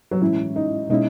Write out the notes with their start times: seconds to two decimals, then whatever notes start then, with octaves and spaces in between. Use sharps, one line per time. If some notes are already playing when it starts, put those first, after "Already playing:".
0.11 F#3
0.22 A2 E3 G#3 C#4 E4
0.56 D#4
0.90 B2 G#3 C#4 D#4 E4